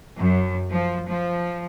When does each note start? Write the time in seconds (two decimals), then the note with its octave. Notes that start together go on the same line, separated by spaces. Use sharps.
0.18 F#2
0.70 F3
1.07 F3